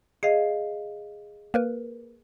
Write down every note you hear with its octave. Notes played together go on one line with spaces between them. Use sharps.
G#4 D#5 F5 C7
A#3 A#4 B4